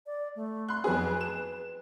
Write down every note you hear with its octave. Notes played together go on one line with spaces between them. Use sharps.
D5
A3
C6 F#6
F2 B3 G#4 B4
E7